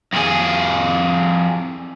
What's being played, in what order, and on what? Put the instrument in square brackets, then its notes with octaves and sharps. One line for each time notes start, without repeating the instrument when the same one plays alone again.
[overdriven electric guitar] F2 G#4